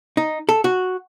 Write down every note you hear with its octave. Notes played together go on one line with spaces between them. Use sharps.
D#4
A4
F#4